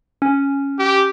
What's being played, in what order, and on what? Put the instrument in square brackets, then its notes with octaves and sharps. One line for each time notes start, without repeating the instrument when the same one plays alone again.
[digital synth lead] C#4
[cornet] G4